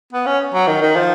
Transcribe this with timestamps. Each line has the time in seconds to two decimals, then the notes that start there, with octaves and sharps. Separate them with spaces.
0.13 B3
0.26 C#4
0.54 F#3
0.67 D#3
0.82 D#3
0.96 F3